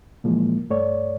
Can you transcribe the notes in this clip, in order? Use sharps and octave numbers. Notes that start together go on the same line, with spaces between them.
A#2 E3 F3 G#3 A#3
G2 A3 C#5 D5